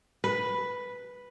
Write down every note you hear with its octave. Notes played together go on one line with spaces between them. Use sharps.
B4